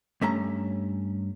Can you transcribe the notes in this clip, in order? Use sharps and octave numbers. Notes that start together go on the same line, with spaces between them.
G2 A3 C#4 A#5